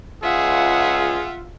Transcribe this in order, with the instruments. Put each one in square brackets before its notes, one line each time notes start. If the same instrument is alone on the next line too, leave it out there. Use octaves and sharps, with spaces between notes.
[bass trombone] C#2 [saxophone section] F4 [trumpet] G#4 [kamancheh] E5 F#5